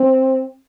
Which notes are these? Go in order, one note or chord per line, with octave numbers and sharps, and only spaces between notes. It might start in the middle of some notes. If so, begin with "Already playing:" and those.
Already playing: C4